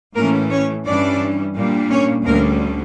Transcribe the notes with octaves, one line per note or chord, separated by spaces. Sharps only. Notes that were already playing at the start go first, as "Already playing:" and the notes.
A2 E3 A3 A#3 C#4 A#4
C#4 C#5
G2 E3 G3 C#4 D4 D5
A#2 G3 A#3 D4
C#4 C#5
D2 D3 G3 A#3 C#4 A#4